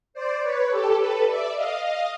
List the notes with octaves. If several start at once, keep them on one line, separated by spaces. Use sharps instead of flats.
C5 D5
B4 C#5
G4 A4
A4 B4
D5 E5
D#5 F5
D#5 F5